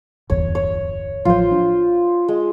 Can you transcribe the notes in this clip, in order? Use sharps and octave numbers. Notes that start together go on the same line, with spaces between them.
D1 G1 E2 C#5
C#5
A1 F3 F#3 F4 C5
D4
G#3